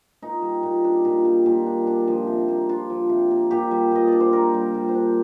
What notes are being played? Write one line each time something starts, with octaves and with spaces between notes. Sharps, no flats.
A#2 D#4
G3
A#2
D4
A#2
G3
A#2
D4
D4
F3
C3
A#3
D4 F4
F3
C3
A#3
A#2 G4
G3
A#2 D#5
D4 D5
C5
A#2 A#4
G3
A#2
C5
D4